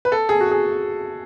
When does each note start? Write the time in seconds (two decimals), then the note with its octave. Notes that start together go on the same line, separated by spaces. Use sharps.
0.05 B4
0.12 A4
0.29 G#4
0.40 F#4
0.51 G#4